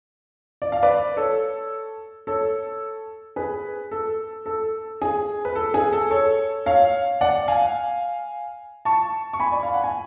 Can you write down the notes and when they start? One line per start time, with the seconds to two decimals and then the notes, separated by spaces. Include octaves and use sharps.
0.62 D5
0.72 F5
0.83 B4 D5
1.16 A4 C#5
2.27 A4 C#5
3.36 G#4 B4
3.91 A4
4.46 A4
5.02 G#4
5.45 B4
5.55 A4
5.74 G#4
5.93 A4
6.11 A4 C#5
6.66 C#5 F5
7.21 D5 F#5
7.48 F5 G#5
8.85 A5 C#6
9.33 C#6
9.40 G#5 B5
9.52 D5
9.63 F5
9.74 F#5
9.84 G#5